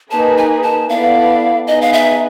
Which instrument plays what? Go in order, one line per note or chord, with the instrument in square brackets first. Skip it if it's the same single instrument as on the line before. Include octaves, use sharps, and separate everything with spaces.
[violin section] A#3 D#4 G#4 B4 [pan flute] A5
[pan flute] G#5
A5
[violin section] B3 E4 A4 D5 [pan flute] F5
[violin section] B3 D#4 G#4 B4 [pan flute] D#5
[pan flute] F5
E5